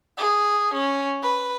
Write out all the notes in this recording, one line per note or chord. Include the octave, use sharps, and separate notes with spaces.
G#4
C#4
B4